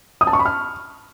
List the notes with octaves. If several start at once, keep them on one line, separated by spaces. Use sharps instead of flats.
D#6
A5
C#6
B5
F6